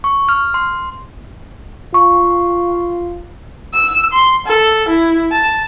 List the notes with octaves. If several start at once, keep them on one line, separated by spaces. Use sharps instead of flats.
C#6
F6
C6
F4 C#6
E6
C6
A4
E4
A5